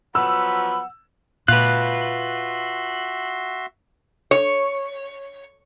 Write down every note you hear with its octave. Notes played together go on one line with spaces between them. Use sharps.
F3 F#3 B3 F#5 B5 E6
A#2 F4 F#4 B4 E5 C6 F#6
C#5